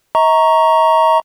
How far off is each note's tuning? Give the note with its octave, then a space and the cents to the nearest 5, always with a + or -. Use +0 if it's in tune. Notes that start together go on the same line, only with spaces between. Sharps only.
D#5 +45 A#5 +0 C#6 +0